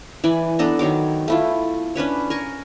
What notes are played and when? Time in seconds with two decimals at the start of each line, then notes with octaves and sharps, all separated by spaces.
0.24 E3 D5 G#5 B5
0.59 B3 D4 A4 A#5
0.79 D#3 F#3 C#5 D6
1.28 A3 E4 F4
1.96 C#4 D4 B4 C#5
2.30 A#4 G#5 C#6